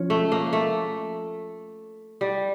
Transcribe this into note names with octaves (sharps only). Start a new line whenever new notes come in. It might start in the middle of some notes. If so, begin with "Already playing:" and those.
Already playing: F3 C#4 F4 C#5
A3
A#3
A3
G3